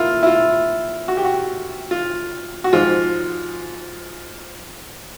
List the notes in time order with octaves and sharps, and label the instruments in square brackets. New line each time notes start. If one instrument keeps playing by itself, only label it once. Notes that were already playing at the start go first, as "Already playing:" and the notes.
Already playing: [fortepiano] A#3 E4 F4
E4
F4
F#4
G4
F#4
F4
F#4
G#2 F3 G#3 F4